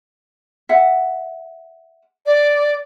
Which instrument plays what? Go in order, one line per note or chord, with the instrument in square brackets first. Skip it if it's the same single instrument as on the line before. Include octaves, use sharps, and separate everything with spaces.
[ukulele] E5 F#5
[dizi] D5